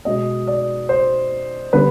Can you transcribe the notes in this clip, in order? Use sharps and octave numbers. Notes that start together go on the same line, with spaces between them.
B2 G#3 B3 D#5
D5
C5
D3 G3 B3 B4